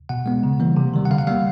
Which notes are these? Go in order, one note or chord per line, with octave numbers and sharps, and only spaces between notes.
B2 F#5
G#3 B3
C#3
E3 G3 A#3
C3
D#3 G3
F#5
D3 F5
F#5
G3 A#3 F5